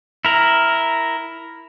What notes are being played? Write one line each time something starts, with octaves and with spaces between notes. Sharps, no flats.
E4 A#4